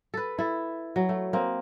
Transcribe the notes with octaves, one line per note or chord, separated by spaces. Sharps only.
A4 B4
E4 A4
F#3
A3
A#3 C4